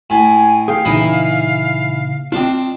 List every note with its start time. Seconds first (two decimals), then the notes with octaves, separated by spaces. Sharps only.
0.10 A2 G#5
0.68 G#4 F5 G5
0.85 A#2 C#3 E3 D#4 E4 D#5
2.32 C4 D4 F4 D#5